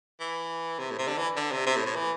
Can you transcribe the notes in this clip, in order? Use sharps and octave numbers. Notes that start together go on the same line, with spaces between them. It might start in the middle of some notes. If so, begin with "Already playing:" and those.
E3
C3
A2
C3
D3
E3
D3
C3
C3
A2
A2
E3